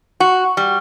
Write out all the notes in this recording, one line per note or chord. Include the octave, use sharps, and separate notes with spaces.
F#4
G3